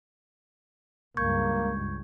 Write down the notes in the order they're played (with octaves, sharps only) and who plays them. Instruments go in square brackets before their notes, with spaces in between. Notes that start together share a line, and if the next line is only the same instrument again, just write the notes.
[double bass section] C#2 G2 [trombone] A#3 [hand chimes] C#6 G6 G#6